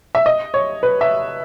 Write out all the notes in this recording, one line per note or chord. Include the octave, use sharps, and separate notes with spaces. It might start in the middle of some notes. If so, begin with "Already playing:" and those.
E5
D#5
C#5
B4
E5